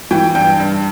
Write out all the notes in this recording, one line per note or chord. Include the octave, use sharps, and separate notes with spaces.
E3 G5
G2 G5
G2